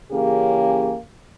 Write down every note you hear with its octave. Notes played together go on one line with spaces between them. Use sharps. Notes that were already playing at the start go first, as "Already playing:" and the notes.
C#3 E3 A#3 C#4 G4 G#4